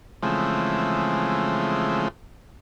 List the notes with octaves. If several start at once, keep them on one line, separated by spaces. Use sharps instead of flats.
C#3 E3 F3 G#3 A3 C4